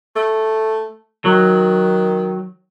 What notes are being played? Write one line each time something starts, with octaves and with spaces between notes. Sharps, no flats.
A3
D#3 F#3